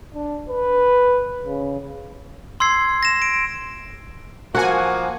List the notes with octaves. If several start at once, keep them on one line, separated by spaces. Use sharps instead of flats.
D4
B4
C#3
C6 E6 G#6 C7
A#6 E7
D7
F3 A#3 F#4 C#5 F#5 G#5